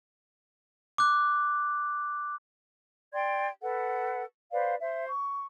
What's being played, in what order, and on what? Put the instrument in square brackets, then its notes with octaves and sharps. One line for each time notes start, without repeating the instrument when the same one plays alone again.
[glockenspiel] D6 F#6
[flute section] D5 G5 C6 G#6
A4 B4 F#5
B4 C5 D5 F5
C5 E5
C#6